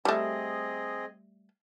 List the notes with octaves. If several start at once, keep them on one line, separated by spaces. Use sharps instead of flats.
G3 A3 C4 G#4 D#5